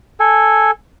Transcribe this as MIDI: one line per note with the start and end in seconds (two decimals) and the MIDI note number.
0.20 0.71 69
0.20 0.71 80